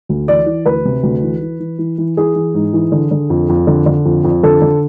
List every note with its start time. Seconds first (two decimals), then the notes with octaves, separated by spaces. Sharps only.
0.09 D2
0.28 E3 D5
0.46 E3
0.66 D2 B4
0.85 C3
1.03 D2
1.23 E3
1.41 E3
1.60 E3
1.79 E3
1.98 E3
2.17 E3 G#4
2.35 E3
2.54 G#2
2.73 E3
2.92 D3
3.11 D3
3.30 F2
3.49 F2
3.67 D3
3.86 D3
4.05 F2
4.24 F2
4.43 D3 A4
4.61 D3